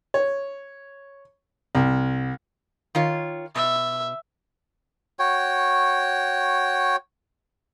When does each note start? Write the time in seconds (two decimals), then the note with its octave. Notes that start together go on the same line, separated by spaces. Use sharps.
0.14 C#5
1.75 C2
2.95 D#3 F4 C#5
3.56 B2 E5
5.19 F#4 C#5 G5